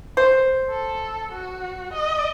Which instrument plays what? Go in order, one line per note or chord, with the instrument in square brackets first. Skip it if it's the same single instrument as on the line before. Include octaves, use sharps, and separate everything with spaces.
[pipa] C5
[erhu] A4
F#4
D#5